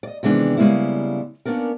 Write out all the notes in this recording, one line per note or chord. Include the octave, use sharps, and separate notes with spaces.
D5 D#5
C3 D#3 E3 G#3 B3 D4
C#3 G3 G#3 A#3 B3 E4
A#3 B3 C#4 D4 A#4